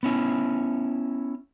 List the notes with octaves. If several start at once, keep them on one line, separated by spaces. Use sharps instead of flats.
B3 C#4 E4